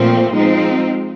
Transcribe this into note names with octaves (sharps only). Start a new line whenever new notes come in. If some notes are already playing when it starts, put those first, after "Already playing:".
Already playing: A#2 F3 A3 C4
F3 G#3 C4 D#4